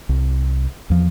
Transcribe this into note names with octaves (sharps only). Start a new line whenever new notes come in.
C2
E2 F3